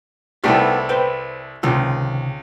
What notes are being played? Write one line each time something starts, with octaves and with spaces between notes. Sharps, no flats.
C2 G3 A3 B3 D#4 G4
B4 C5 G5
C#2 C3 D#3 G#3